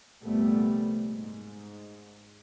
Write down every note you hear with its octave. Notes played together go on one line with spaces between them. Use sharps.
F1 C2 A#2 G3 A3 B3
G#2